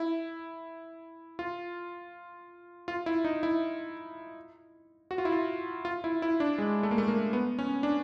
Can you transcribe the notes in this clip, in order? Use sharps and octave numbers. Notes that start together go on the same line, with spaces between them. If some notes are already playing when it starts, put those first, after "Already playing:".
Already playing: E4
F4
F4
E4
D#4
E4
F#4
F4
E4
F4
F4
E4
E4
D4
G#3
A3
A#3
A3
A#3
B3
C#4
D4